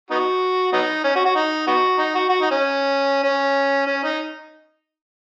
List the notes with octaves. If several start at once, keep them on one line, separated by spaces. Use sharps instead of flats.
B3 D#4 F#4
F#3 B3 D#4
C#4
F#4
F#4
D#4
B3 D#4 F#4
D#4
F#4
F#4
D#4
C#4
C#4
C#4
D#4